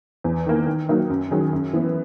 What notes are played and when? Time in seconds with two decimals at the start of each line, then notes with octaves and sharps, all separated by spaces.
0.24 E2
0.46 D#3 A#3
0.67 D#3
0.89 F#3 A#3 D#4
1.10 F#2
1.31 D#3 F#3 C#4 G#4
1.53 F#2
1.73 E3 B3